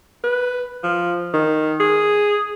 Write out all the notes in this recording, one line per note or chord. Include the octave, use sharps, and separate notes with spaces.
B4
F3
D#3
G#4